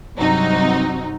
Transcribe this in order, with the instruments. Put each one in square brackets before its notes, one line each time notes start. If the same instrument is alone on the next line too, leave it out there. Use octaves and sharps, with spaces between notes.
[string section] G2 C3 F#3 C4 D#4 F#4